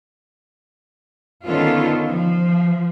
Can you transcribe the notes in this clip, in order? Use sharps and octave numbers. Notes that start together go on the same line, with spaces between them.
D3 D#3 B3 C#4 F4 A4
F3